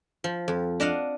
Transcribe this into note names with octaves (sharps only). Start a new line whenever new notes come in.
F3
F2
D4 D#5 F5 F#5